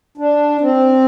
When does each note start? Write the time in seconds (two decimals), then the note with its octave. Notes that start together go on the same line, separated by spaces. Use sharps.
0.18 D4
0.61 C4